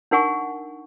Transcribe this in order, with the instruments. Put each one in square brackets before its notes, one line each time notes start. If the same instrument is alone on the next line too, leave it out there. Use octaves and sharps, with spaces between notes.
[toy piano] D4 D#4 A#4 F#5 G#5 C#6